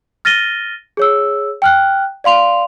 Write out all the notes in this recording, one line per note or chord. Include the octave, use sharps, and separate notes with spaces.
F6 A6 A#6 D#7 G7
G#4 C#5 E6
G5 F6 F#6
D5 F5 C6 F7